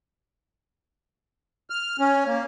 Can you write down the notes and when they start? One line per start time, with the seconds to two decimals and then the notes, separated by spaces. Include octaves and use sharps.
1.70 F6
1.99 C#4
2.26 A#3